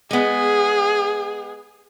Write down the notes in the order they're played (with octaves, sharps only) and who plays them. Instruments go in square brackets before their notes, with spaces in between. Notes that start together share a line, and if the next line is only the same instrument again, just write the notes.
[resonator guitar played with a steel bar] G#3 B3 [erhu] G#4